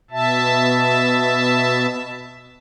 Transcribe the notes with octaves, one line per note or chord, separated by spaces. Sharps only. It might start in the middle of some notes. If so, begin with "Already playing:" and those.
B2 E5 A5